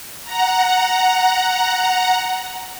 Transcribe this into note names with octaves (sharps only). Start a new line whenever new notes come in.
F#5 A#5